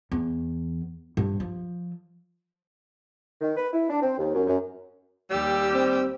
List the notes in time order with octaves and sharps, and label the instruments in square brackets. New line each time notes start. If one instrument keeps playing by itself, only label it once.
[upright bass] E2
G2
F3
[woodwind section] D#3
B4
E4
D4
C4
D#2
F#2
F#2
[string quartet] D#2 G4 E6 [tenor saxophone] G3
[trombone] C4